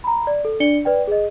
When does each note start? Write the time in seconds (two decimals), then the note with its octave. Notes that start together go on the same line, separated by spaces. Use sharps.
0.04 A#5 B5
0.27 D5
0.45 A4
0.60 D4 D5 C#7 G7
0.85 B4 D5 G5
1.07 G#4 D#5